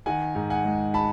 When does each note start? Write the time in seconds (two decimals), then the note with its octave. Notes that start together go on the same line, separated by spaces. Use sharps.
0.06 D#3 F#5 G#5
0.35 G#2
0.50 F#5 G#5
0.64 G#3
0.94 A5 B5